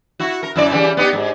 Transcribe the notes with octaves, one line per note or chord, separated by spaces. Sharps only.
E4 F#4
A#4
F#2 E4 D5
C#3 E3 G3
B3 D#4 G4
G#2